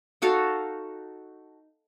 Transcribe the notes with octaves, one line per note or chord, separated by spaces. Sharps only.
D#4 F#4 A4 F5